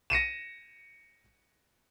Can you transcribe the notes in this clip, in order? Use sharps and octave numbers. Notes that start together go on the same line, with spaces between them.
A#6 C#7 D#7 E7